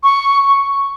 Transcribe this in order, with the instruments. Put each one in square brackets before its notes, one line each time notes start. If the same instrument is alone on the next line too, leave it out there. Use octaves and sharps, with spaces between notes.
[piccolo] C#6